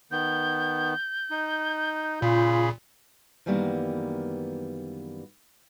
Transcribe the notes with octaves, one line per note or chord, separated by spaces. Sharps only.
D#3 B3 G6
D#4
A#2 C#3 F4 G#4 B5
F#2 D#3 E3 G3 A#3 B3